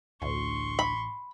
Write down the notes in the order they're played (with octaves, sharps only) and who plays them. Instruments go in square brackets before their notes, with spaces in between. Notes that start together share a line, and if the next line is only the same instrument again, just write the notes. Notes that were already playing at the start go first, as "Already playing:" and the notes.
[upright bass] A1 [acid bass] D2 [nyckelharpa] C6 C#6
[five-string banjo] B5